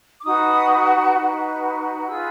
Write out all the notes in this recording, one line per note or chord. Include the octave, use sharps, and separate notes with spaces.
D6
D#4 F#4 B4 D#6
D#4 F#4 B4
F4 G#4 B4 E6